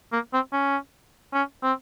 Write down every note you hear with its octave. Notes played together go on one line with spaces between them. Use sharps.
A#3
C4
C#4
C#4
C4